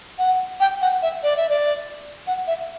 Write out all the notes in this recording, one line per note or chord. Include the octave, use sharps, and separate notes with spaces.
F#5
G5
F#5
E5
D5
E5
D5
F#5
E5